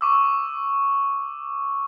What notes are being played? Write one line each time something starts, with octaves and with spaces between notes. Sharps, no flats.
C#6 D6 E6